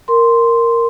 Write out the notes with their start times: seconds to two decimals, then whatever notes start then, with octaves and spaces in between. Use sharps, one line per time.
0.08 A#4 C6